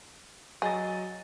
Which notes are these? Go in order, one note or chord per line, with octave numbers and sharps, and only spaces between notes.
F#3 G#4 D#5 A6